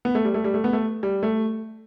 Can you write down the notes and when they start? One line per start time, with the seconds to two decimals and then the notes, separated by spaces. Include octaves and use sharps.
0.05 B3
0.15 A3
0.25 G3
0.34 A3
0.44 G3
0.54 A3
0.64 B3
0.73 A3
1.03 G3
1.23 A3